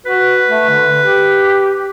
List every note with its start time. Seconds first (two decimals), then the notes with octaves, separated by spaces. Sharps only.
0.06 F#4 B4
0.47 A3
0.70 D3
1.00 G4